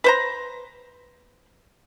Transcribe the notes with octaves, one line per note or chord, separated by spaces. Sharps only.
B4 C5 A#5